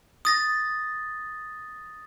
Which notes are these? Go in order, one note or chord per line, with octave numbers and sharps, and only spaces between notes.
D#6 A6 A#6